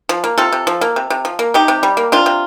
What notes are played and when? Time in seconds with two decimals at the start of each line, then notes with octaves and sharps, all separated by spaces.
0.09 F3
0.24 A#3
0.38 C3 F4 A4
0.52 C3
0.67 F3
0.81 A#3
0.96 C3
1.10 C3
1.25 F3
1.39 A#3
1.54 C3 D#4 G4
1.68 C3
1.83 G3
1.97 A#3
2.12 C3 D4 F4
2.26 C3